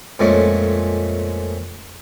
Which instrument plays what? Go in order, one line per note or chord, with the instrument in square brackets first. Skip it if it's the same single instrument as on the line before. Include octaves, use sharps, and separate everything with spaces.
[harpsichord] F2 A#2 G#3 A3 C#4